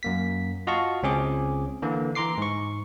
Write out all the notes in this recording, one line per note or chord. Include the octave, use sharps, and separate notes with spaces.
F#2 A#3 B6
F4 F#4 D#5 F5 A5 C#6
C#2 C4 C#4 G#4 D6
D3 E3 A#3
E3 A#5 C6 D6 C7
G#2 C#6